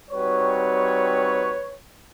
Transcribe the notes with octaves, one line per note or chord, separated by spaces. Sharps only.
G3 C4 D#4 F#4 B4 C#5